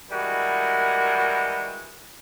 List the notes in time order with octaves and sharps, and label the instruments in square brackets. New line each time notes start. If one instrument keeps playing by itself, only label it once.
[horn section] E3 G3 G#3 F#4 A#4